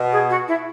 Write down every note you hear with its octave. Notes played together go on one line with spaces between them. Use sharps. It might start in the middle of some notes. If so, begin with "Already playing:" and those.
Already playing: B2
G#4
F#4
E4